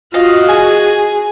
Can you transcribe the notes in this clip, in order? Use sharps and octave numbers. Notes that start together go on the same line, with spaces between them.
F4 F#4 D#5 F5
G#4 G#5